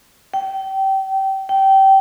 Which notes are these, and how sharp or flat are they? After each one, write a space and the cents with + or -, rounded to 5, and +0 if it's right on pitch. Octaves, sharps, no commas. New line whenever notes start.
G5 -25
G5 -20